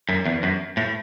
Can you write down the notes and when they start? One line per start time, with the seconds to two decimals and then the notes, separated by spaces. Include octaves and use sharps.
0.09 F#2
0.26 E2
0.43 F#2
0.77 A2